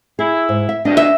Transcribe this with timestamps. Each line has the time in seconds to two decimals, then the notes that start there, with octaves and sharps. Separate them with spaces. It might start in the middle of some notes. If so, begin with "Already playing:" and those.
0.19 E4 G#4
0.49 G#2
0.69 E5
0.85 D2 G2 D4 D#5
0.97 E5